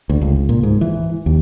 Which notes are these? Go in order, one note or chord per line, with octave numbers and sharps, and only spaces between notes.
D2
C#2
A#2
G#2
E3
D#2